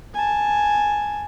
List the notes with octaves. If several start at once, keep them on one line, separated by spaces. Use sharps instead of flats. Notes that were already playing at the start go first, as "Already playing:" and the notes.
G#5 A5